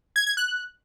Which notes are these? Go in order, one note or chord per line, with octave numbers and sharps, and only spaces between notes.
G#6
G#6
F#6